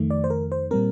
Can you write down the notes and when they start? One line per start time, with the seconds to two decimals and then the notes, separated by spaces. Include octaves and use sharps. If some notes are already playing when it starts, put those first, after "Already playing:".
Already playing: F2 D#3 A3
0.10 D5
0.24 C5
0.30 A#4
0.52 C5
0.71 A#2 G3 C4 A#4